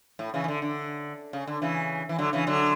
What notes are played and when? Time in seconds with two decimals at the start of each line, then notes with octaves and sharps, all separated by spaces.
0.19 A2
0.34 C#3 E3
0.44 E3
0.48 D3
0.62 D3
1.33 C#3
1.47 D3
1.62 C#3 E3
2.09 E3
2.19 D3 F#3
2.33 C#3 E3
2.47 D3 F#3